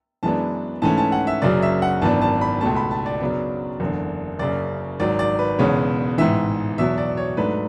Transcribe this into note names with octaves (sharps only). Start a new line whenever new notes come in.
F#2 E3 G#3 B3 D4 A5
G#2 E3 A3 C#4 A5
A5
F#5
E5
F#1 F#2 C#3 F#3 D5
E5
F#5
G#1 F#2 E3 B3 D4 A5
A5
B5
C#2 B2 A3 A5
B5
A5
D5
F#2 C#3 F#3 B3 D4
F#1 E2 D3
F#1 F#2 C#3 D5
G#1 G#2 F#3 D5
D5
B4
E1 E2 C#3 G#3 B3 C#5
A1 G#2 E3 E5
E2 B2 F#3 E5
D5
C#5
G#2 F#3 A3 D4 B4